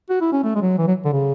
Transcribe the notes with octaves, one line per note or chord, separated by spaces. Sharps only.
F#4
E4
C#4
A3
G#3
F#3
E3
F#3
D3
C#3